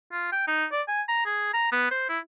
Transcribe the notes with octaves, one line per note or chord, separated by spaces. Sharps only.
F4
G5
D#4
D5
G#5
A#5
G#4
A#5
B3
C5
E4